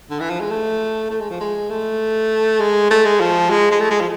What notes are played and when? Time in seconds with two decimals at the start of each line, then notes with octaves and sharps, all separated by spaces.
0.10 D3
0.20 E3
0.30 F3
0.40 G#3
0.50 A3
1.10 A3
1.20 G#3
1.30 F3
1.40 G#3
1.70 A3
2.60 G#3
2.90 A3
3.05 G#3
3.20 F3
3.50 G#3
3.71 G#3
3.80 A3
3.90 G#3
4.00 F3